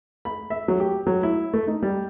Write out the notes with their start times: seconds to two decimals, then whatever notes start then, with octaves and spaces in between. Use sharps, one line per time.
0.25 B5
0.50 E5
0.68 F#3
0.80 G4
1.07 F#3
1.23 E4
1.54 A3
1.67 D#4
1.83 G3